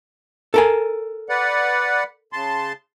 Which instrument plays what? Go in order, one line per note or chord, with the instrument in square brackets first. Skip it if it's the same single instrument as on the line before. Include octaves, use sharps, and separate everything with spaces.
[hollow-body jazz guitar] A4 A#4 G#5
[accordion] B4 D5 F#5
C#3 A5 C6